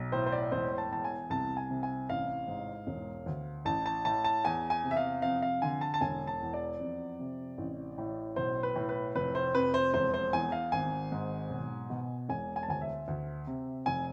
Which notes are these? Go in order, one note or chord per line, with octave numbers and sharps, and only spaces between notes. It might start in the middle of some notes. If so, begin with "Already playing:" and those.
Already playing: B1
A2 C5
C5
D5
E1 C5
A5
E2 A5
G#5
C2 A5
G#5
C3
G#5
A1 F5
G#2
E1
D2
A1 A5
A5
A2 A5
A5
E2 G#5
G#5
C3
E5
F5
F2 F5
F5
D3 G#5
A5
A5
E1 G#5
A5
E2
D5
F2
C3
A1
A2
B1 C5
B4
A2
B4
F1 B4
C5
F2 B4
C5
E1 C5
C5
E2 G#5
F5
G#1 G#5
G#2
B1
B2
E1 G#5
G#5
A5
D2 G#5
E5
D2
C3
F1 G#5